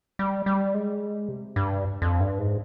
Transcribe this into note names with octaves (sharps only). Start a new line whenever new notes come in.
G3
G3
G#3
C3
G2
F2
G2
G#2